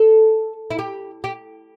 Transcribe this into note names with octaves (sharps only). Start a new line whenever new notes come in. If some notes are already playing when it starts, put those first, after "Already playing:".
Already playing: A4
E4
G4
G4